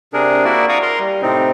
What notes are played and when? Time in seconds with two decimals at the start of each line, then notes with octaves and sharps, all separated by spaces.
0.13 C3 D4 G#4 A#4
0.45 A#3 E4 F#4 A#4 D5
0.69 D5 F5 A#5 C#6 D#6
0.82 A#4 A#5 C6
1.00 G3
1.22 A2 C3 C4 D#4